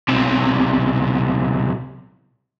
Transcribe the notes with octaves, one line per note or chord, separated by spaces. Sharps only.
B1 C3